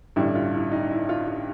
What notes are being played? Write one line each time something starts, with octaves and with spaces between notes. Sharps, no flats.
A1 G2 D3 G3 E4
F4
E4
D#4
E4
F4
F4